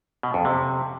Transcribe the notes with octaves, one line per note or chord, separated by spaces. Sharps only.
B2
F2
C3